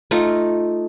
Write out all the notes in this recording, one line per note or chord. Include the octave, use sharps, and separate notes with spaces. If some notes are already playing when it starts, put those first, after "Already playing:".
A3 D#4 F4